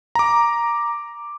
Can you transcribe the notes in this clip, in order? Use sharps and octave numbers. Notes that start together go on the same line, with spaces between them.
A#5 D6